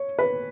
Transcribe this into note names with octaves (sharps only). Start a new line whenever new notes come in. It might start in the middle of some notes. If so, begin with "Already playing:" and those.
Already playing: C#5
B4